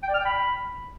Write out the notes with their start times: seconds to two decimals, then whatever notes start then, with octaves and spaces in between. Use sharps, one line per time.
0.03 G5
0.09 D5
0.14 F6
0.20 G5
0.25 B5